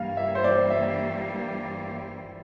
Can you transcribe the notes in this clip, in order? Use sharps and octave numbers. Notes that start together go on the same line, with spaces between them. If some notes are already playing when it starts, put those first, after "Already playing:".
Already playing: G2 E3 G3 A#3 F5
E5
C5
D5
E5